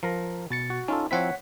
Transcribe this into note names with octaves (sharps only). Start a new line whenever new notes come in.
F3 A#4 A#5
B2 A6 C#7
F#4
C#4 D#4 F4 A4
F3 C4 E4 C#5 F#5 B6